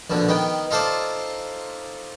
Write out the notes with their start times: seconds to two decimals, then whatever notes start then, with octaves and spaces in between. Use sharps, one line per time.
0.10 A#1 B2 D3
0.29 D#3 B3 G5
0.71 D#4 F4 A4 C5 D5